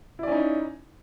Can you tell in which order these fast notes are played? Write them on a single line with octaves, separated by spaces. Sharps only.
E4 D5 C#4 D#4